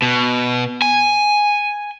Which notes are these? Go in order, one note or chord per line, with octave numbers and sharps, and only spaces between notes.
B2
G#5